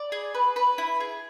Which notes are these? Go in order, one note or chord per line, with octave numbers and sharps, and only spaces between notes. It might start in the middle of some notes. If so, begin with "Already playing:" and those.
Already playing: D5
G#4
B4
B4
E4
G#4